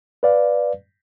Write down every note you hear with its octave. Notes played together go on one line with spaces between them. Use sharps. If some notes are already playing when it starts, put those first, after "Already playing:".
B4 D5 F5